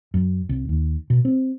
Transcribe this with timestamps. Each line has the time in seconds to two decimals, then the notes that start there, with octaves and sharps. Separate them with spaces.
0.14 F#2
0.49 C2
0.69 D#2
1.10 B2
1.25 C4